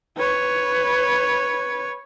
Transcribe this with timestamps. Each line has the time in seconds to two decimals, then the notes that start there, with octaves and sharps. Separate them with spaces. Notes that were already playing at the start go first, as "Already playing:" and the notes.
0.17 B4 C#5